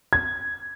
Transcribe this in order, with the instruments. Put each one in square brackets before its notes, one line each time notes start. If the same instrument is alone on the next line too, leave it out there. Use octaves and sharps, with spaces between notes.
[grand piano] G#6